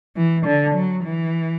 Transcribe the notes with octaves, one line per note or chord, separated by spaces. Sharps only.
E3
D3
F#3
E3